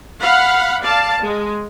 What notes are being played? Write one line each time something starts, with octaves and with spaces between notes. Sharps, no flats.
F5 F#5 B5
D5 F5 A5
G#3